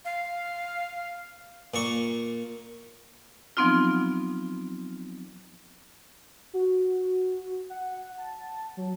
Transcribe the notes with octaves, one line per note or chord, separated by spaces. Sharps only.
F5
A#2 A#3 C#6
F3 F#3 B3 C4 D#4 F4
F#4
F#5
A5
F#3